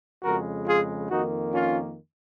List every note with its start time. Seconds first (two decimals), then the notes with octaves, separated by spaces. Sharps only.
0.23 F2 C#3 G#3 F#4 A#4
0.66 F4 G#4
1.10 F2 D#3 A#3 D#4 F#4
1.53 C#4 F4